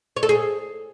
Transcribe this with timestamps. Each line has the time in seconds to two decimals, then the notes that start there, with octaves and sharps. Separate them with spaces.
0.17 C#5
0.23 A4
0.29 G#4